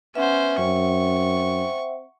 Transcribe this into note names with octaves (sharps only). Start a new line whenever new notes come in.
B3 C#4 C5 E5 F#5
F#2 C4 C#6